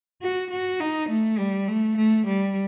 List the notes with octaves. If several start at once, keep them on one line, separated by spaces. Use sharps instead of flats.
F#4
F#4
D#4
A3
G3
A3
A3
G3